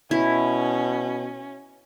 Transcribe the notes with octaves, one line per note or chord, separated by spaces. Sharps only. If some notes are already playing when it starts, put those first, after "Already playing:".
B2 C#4 E4